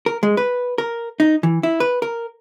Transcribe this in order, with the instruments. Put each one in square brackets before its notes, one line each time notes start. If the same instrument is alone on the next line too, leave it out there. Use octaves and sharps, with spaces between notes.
[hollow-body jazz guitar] A#4
G#3
B4
A#4
D#4
E3
E4
B4
A#4